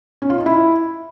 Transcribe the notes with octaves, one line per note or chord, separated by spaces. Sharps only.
C#4
F4
D#4
E4